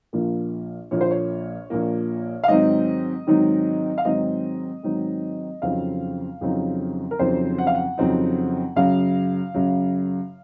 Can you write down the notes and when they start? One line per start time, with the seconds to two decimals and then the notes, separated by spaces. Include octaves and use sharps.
0.13 A#1 A#2 F3 A#3
0.91 A#1 A#2 F3 A#3 C#5
1.01 C5
1.11 C#5
1.70 A#1 A#2 F3 A#3
2.44 F5
2.48 G#2 D#3 F#3 C4 D#4 D#5
3.27 G#2 D#3 F#3 C4 D#4
3.98 F5
4.05 G#2 D#3 F#3 C4 D#4 D#5
4.83 G#2 D#3 F#3 C4 D#4
5.62 F2 C#3 F#3 C4 D#4 F5
6.41 F2 C#3 F#3 C4 D#4
7.11 A#4
7.19 F2 C#3 F#3 C4 D#4 C5
7.58 F#5
7.67 F5
7.75 F#5
7.98 F2 C#3 F#3 C4 D#4
8.76 F#2 C#3 F#3 F5
9.54 F#2 C#3 F#3